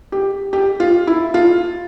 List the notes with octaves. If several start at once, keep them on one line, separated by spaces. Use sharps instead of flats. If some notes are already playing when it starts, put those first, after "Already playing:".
G4
G4
F4
E4
F4